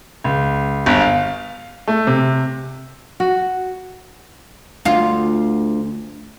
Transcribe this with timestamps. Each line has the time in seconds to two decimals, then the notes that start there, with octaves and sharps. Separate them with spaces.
0.24 C#2
0.86 G1
1.01 F5
1.87 A3
2.07 C3
3.20 F#4
4.85 D2 F4